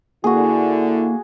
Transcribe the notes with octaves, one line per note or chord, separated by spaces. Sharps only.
D3 A#3 E4 F#4 G#4